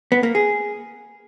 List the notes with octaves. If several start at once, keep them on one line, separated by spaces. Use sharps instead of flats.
B3
A#3
G#4